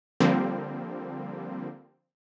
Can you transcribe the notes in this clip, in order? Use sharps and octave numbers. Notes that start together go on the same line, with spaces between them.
D3 F3 G3 A#3 C4